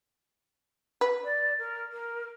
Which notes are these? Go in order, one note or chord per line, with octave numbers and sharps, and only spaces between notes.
B4
D5
A#4
A#4